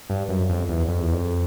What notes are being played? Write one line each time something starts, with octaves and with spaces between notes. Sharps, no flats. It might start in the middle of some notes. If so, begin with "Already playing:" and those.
G2
F#2
F2
E2
F2
E2
F2